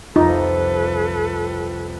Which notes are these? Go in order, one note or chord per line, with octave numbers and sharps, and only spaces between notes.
C2 F2 D#4 F4 A4 B4